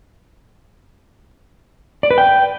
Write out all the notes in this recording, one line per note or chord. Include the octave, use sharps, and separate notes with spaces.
D5
B4
G5